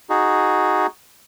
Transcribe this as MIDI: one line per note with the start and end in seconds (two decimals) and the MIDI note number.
0.10 0.87 63
0.10 0.87 66
0.10 0.87 68